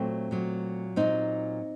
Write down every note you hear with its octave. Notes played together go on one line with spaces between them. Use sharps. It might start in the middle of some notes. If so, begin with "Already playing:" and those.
Already playing: A#2 F#3 A3 C4
A#2 F#3
A#2 F#3 C4 D#4